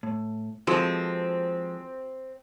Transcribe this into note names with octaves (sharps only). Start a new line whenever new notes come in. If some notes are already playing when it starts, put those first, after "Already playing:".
A2
F3 G#3 C4 F#4 A4 B4